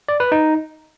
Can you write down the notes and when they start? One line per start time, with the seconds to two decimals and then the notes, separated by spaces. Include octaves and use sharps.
0.08 D5
0.20 B4
0.32 D#4